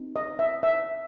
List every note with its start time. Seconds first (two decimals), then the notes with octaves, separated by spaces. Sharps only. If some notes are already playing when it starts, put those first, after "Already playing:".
Already playing: C4 D#4
0.16 D#5
0.39 E5
0.63 E5